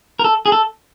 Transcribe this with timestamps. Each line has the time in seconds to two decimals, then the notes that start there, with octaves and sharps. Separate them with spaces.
0.19 A#4
0.24 A4
0.46 G#4
0.52 A4